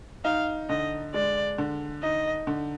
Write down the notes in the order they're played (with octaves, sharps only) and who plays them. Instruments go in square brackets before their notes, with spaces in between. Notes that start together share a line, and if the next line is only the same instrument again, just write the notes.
[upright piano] D#4 [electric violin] F5
[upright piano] D3 [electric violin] D#5
[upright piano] G#3 [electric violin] D5
[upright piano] D3
[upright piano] D#4 [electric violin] D#5
[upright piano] D3